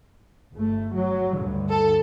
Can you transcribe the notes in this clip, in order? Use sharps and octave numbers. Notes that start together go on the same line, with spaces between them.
G1 A3
F#3
D2 G2 D3
A4